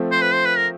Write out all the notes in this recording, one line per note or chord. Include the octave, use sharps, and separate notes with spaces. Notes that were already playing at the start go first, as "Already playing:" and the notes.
Already playing: F3 A3 C4
C5
B4
C5
B4
A#4